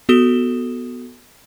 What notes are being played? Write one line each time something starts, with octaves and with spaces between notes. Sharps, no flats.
B3 F#4 A4 D#6 E7 G7